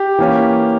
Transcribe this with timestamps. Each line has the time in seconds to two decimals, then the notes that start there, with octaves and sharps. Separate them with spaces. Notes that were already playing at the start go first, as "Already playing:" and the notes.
Already playing: G4
0.19 E3 A#3 C#4